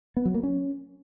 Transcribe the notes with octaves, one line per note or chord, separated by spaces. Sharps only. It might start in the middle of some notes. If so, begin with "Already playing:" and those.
B3
F#3
A#3
C#4